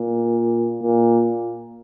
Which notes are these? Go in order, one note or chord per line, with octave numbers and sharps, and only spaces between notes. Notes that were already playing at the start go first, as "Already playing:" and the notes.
Already playing: A#2
A#2